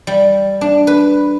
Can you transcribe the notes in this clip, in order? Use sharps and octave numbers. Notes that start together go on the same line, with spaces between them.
G3
D4
B4